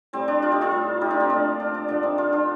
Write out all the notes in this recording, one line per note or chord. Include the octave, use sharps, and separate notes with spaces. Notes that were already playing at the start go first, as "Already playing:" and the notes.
A2 G3 C4
D4
D4 F4
D#4 G4
F4 A4
A2 G3
D#4 G4
D4 F4
C4 D#4
A#2 A3 D4
D4
D4
D3 F3 A3 D4
C4 D#4
D4 F4
D4 F4